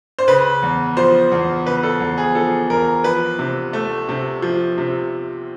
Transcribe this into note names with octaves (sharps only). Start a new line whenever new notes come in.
C5
C#3 B4
E2
F3 C5
E2
C#3 B4
A4
E2
G#4
F3 A4
E2 A#4
F3 B4
C3
A3
C3
F3
C3